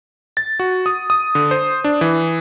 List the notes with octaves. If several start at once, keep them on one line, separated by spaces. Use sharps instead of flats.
A6
F#4
D#6
D#6
D3
C5
D4
E3